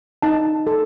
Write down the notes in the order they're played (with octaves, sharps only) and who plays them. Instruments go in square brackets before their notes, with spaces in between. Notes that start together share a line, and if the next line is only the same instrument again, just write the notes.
[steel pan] D#4 A5
A4